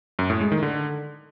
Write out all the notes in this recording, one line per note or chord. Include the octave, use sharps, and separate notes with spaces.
F#2
A2
G#3
D#3
D3